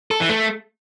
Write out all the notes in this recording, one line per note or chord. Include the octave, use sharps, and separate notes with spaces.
A4
E3
A3